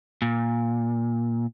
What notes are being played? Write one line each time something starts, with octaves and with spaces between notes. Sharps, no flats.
A#2